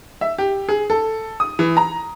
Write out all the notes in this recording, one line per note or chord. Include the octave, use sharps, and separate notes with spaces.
E5
G4
G#4
A4
D#6
E3
A#5